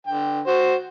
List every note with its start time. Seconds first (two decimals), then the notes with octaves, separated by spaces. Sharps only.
0.07 D3 G5
0.47 F#4 C5